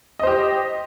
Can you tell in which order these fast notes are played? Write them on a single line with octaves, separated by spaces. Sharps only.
D#5 C5 G4